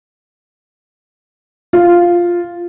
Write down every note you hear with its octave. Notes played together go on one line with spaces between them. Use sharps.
F4